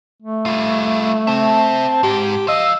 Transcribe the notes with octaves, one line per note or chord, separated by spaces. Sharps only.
A3
G3 F4
C4 C5 E5 A5
G#2 G4
F3 D#5 F5 E6